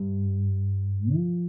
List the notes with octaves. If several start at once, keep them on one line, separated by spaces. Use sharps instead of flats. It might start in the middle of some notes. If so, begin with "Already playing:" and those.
Already playing: G2
F3